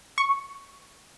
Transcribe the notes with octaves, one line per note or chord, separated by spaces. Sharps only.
C#6